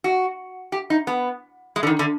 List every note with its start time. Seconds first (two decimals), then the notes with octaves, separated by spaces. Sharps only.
0.04 F#4
0.72 G4
0.90 D#4
1.07 B3
1.76 G#3
1.83 D3
1.87 D#3
1.99 D3